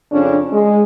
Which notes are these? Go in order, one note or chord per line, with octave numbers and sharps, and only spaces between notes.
F2 C#3 C#4 D4
G#3